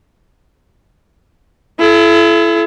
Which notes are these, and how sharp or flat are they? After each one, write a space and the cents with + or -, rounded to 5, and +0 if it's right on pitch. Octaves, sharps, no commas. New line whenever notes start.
E4 +30 A4 -30